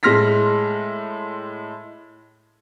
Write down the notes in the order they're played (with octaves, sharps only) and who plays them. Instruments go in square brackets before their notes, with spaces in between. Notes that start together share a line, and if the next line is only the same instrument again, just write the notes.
[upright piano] A2 G#3 C6 F6 A#6 B6